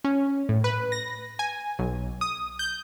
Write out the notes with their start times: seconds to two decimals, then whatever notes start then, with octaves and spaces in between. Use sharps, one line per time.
0.04 C#4
0.49 A2
0.64 B4
0.92 A#6
1.39 G#5
1.79 B1
2.21 D#6
2.59 G6